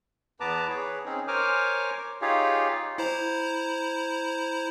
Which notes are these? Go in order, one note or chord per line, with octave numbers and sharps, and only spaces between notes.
E2 B3 B4 A5 A#5 D6
G#4 B4 C#5
C4 C#4 D#4 G#4
A#4 C5 C#5 G#5 D6 F6
D#4 F4 G4 G#4 C#5 F5
E4 C5 A#5